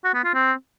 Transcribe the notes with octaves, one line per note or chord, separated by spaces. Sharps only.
F#4
B3
F4
C4